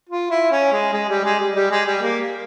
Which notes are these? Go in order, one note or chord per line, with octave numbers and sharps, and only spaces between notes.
F4
E4
C#4
G#3
G#3
G3
G#3
G3
G3
G#3
G3
A#3